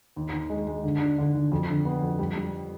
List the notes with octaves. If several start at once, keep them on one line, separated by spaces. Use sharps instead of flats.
D#2
D#2
G#3
G#3
D3
D4
D3
D3
F2
D3
B3
F2
G3
G3